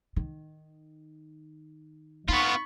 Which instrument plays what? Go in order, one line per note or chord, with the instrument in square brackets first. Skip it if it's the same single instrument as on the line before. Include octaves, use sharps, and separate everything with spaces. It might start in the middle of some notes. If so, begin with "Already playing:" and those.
[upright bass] D#3
[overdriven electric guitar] B3 F4 [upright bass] D#4 [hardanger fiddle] B5 C#6